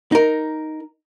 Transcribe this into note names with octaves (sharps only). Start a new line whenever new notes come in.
D#4 A#4